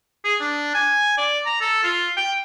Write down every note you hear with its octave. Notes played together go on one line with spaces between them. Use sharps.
G#4
D4
G#5
D5
A#5
A4
F4
G5